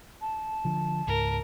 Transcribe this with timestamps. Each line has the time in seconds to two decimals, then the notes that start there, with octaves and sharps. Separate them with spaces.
0.21 A5
0.65 D3 F3
1.07 C#2 G#2 A#4